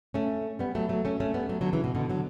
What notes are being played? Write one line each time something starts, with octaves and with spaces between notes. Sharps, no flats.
A3 C#4
G3 B3
F#3 A3
F#3 A3
A3 C#4
A3 C#4
G3 B3
F#3 A3
D3 F#3
C#3 E3
B2
B2 D3
D3 F#3